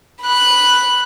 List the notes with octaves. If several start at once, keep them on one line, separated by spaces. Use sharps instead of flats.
B5 F#6